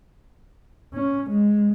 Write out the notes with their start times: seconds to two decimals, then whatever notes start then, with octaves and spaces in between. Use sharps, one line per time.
0.94 C#4
1.29 G#3